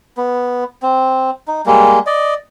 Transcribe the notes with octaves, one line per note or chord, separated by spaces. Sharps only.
B3
C4
D#4
G3 G#3 A#3
D5 D#5